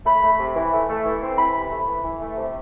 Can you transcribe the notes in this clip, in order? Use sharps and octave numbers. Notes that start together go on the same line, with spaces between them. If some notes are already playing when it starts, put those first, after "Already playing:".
A3 B5
A3
C3
E3
A3
A3
E3
C4
E3 B5
C3
A3
E3
E3
A3
C3